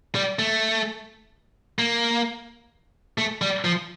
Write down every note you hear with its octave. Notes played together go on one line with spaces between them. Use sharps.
G3
A3
A#3
A3
G3
F3